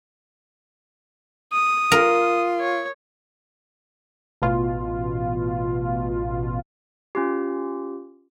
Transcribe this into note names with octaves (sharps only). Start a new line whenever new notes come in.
D#6
F4 A#4
C#5
A1 B2 F4
C#4 F4 G4